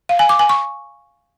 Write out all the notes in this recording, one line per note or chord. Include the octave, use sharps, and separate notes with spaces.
F5
G#5
D6
G#5
C#6